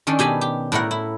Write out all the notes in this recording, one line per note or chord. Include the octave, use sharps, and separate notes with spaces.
D#3 C#4 D4 A4
B2 G4 G#5 B5
G4
A2 E4 A#4 F#5
E4